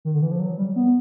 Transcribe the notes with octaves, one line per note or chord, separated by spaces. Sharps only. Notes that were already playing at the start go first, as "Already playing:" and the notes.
D#3
D3
E3
F3
F#3
G3
B3